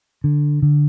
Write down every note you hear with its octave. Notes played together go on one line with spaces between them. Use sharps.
D3
D3